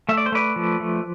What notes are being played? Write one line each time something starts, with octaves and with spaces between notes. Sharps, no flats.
A3 E5
D5
C5
A3 B4 D5
F3
A3